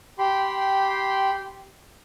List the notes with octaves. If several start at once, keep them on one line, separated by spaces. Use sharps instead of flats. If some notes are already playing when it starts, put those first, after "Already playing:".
G4 G5 B5 C6